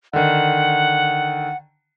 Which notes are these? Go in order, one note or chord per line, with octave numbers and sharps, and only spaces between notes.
D3 D#3 F#5